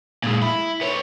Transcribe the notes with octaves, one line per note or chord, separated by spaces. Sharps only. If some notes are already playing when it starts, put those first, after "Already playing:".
A#2 G#3
E4
B3 C#5